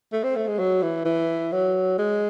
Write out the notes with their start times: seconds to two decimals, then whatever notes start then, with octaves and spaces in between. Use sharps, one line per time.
0.13 A3
0.24 C4
0.36 A3
0.47 G#3
0.59 F#3
0.82 E3
1.05 E3
1.52 F#3
1.98 G#3